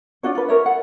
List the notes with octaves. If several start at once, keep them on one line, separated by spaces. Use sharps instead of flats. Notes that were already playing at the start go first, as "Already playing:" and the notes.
D4 F4 F#4 C#5
F4 B4
A#4 C#5 E5
F#5